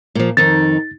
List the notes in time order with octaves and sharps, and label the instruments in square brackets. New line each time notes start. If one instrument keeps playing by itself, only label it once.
[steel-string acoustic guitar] A#2 F3
[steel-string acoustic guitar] F2 D#3 D#4 [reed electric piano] A6